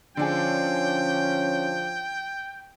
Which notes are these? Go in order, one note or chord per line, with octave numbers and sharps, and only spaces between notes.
D3 F3 C#4 D4 G#4 G5